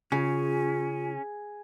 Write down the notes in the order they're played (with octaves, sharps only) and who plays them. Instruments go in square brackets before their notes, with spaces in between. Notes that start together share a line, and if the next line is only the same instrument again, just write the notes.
[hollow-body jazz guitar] C#3 [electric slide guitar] C#4 [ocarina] F4 [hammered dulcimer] G#4